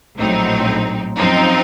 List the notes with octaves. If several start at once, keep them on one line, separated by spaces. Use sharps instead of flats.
A#1 A2 F#3 C4 D#4
F#2 F3 C4 D#4